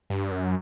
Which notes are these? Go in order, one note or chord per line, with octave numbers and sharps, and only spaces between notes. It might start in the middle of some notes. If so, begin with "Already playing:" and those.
G2
F#2